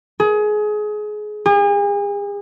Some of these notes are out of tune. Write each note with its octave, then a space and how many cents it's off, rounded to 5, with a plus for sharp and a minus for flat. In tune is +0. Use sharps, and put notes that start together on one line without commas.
G#4 +25
G#4 -40